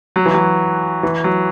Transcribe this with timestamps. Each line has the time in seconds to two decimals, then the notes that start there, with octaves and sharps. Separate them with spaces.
0.16 F#3
0.26 E3
0.34 F#3
1.03 E3
1.24 F#3